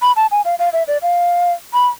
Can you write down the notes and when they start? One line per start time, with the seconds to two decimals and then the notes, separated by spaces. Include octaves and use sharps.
0.02 B5
0.16 A5
0.31 G#5
0.45 F5
0.59 F5
0.73 E5
0.88 D5
1.02 F5
1.74 B5